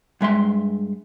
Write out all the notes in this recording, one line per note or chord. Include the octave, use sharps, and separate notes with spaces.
G2 G#3 E5 C6